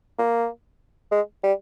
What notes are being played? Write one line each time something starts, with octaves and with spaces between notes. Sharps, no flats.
A#3
G#3
G3